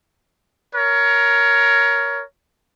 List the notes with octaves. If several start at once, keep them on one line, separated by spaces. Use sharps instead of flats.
A#4 C#5